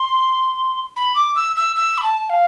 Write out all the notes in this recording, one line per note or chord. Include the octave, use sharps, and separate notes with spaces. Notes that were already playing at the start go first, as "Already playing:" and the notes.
Already playing: C6
B5
D6
E6
E6
E6
B5
A5
F5